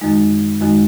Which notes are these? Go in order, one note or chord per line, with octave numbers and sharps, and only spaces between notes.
F#2 D#3 G#3 D#4
F#2 D#3 G#3 D#4